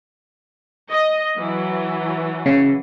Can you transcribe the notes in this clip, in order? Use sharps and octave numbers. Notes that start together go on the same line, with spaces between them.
D#5
E3 F#3
C#3